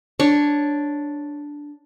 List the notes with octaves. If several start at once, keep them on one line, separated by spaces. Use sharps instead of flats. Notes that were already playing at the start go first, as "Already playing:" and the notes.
D4 C#5